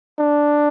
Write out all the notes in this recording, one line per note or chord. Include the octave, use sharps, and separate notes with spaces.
D4